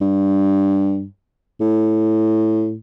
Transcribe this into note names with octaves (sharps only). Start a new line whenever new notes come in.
G2
A2